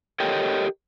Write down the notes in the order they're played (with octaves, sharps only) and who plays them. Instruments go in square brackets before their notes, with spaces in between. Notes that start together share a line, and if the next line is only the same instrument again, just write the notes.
[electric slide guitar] G4 A4 A#4 C#5 D#5 G5